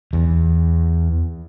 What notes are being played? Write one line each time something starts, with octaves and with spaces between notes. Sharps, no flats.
E2